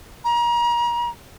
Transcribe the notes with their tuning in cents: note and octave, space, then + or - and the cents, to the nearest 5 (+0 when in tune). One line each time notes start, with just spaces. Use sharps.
A#5 +35